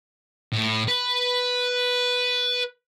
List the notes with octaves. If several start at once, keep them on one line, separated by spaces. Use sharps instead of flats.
A2
B4